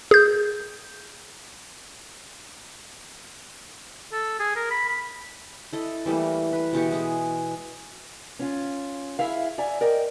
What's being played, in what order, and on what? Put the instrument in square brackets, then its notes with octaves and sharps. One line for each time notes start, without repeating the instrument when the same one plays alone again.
[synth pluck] G#4 G6
[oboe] A4
G#4
A#4
B5
B5
[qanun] E4 A4 D#5
E3 G3 A3 A#3
B4
B2 E3 G4 C#6
G#3 G#4
[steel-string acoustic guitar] C#4 F4
E4 G#4 E5 F5
D5 E5 G#5 A#5
A#4 D5 D#5 G5